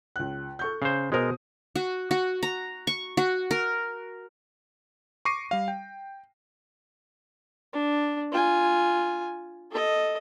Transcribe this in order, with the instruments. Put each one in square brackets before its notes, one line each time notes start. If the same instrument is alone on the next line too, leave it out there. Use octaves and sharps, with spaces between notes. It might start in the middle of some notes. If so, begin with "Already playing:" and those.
[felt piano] C#2 F#6
A4 C#6 G6
[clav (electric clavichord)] C#3 C5 [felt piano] C7
[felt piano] B2 C5 D#6 [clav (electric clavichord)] G#3 A#4
[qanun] F#4
F#4
A#5
C#6
F#4
A#4
[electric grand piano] C#6 D6 A#6 C7 D#7
G3 F5
G5
[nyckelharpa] D4
F4 G#5
A4 D#5